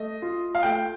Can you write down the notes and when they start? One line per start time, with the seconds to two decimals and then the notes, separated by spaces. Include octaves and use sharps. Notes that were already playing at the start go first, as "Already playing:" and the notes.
Already playing: A3 D#5
0.22 F4
0.55 F5
0.63 A3 G5